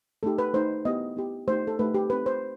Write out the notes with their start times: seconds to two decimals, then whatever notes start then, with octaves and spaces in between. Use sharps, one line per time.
0.23 A3 D#4 G4 A4
0.39 B4
0.54 A3 D#4 G4 C5
0.85 B3 E4 G4 D#5
1.17 B3 E4 G4
1.48 A3 D#4 G4 C5
1.67 A4
1.79 A3 D#4 G4 B4
1.94 G4
2.10 C4 D#4 G4 B4
2.26 C5